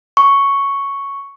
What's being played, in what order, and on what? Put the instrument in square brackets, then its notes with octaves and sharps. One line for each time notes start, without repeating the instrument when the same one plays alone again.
[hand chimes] C#6